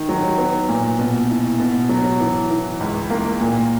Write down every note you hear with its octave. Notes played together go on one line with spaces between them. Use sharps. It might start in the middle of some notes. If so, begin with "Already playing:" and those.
Already playing: D#3
F#3
B3
A#2
B2
E4
B2
F#3
E3
E3
C#2
A#3
A#2